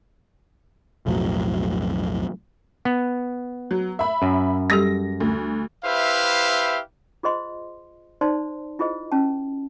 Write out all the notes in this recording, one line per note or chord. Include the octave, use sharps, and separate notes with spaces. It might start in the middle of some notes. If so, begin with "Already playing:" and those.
B1 F2 A2 F#3
B3
F#3
E5 B5
F#2
G3 G4 A4 A#6
D2
E4 G4 B4 C5 E5 F5
F4 G#4 C5 D#5 C6
D#4 C5 D5 A5 C6
E4 F4 G#4 C5 D#5
C#4 A5